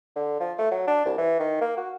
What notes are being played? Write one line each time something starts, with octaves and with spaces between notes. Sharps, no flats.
D3
F3
A3
F#3
D4
C2
E3
D#3
A#3
F#4